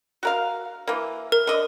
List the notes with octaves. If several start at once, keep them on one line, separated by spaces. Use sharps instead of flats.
F#4 A#4 F5
E3 A#3
A#4
D3 D#5